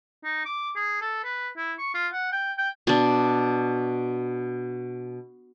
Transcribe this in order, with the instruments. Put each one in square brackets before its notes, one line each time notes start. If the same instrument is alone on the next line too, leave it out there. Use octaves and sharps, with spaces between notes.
[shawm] D#4
D6
G#4
A4
B4
E4
C#6
F4
F#5
G5
G5
[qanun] B2 D4